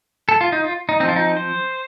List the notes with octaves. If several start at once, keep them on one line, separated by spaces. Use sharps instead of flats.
A4
F4
D#4
F4
D#4
F3 C4 D#4 F4
D#4
C5